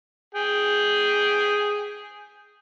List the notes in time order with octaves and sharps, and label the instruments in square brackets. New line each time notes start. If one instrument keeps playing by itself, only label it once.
[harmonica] G#4 G5